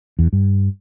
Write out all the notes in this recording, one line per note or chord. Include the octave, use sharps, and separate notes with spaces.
E2
G2